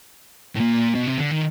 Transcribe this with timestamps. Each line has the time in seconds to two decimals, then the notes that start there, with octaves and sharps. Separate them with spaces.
0.56 A2
0.61 A#2
0.95 B2
1.07 C3
1.18 D3
1.31 D#3